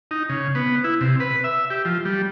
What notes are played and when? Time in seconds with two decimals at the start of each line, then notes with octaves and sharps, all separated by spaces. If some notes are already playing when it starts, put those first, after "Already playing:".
0.11 D#4
0.29 C#3
0.55 B3
0.84 E4
1.01 C3
1.20 B4
1.44 E5
1.70 G4
1.85 F3
2.05 G3